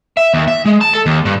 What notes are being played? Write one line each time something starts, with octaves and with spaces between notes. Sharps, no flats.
E5
D#2
E5
G#3
A5
A4
D#2
G2